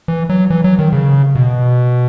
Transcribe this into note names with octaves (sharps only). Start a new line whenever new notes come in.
E3
F#3
E3
F#3
D#3
C#3
B2